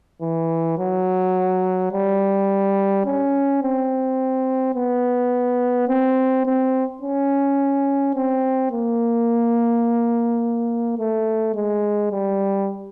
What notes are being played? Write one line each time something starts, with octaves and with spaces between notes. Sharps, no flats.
E3
F#3
G3
C#4
C4
B3
C4
C4
C#4
C4
A#3
A3
G#3
G3